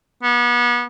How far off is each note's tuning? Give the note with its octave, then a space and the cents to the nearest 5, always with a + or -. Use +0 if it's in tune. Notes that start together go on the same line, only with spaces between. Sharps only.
B3 -35